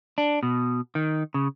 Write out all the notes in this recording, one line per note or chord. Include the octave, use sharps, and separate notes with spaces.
D4
B2
D#3
C#3